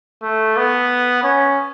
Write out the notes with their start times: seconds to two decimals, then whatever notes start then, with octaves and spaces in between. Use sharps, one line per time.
0.22 A3
0.57 B3
1.23 C#4